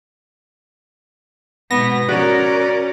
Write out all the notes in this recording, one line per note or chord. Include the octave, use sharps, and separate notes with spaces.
G#2 B2 B3 A#6
C#4 F#4 A#4 D5